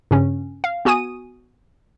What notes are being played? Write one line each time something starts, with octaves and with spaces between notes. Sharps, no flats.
G2 C#3 C#4
F5
B3 F#4 G#5 D#6 D#7